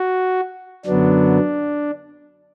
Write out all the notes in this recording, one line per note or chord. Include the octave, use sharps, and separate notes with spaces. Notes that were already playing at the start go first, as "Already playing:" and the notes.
Already playing: F#4
F#2 D3 F#3 B3 D4